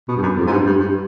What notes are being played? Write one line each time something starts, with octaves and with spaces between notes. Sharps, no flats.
B2
G2
F#2
F2
G#2
G2
G2
G2